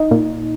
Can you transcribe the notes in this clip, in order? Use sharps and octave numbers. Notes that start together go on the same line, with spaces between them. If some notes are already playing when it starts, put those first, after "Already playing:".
Already playing: D#4
A#2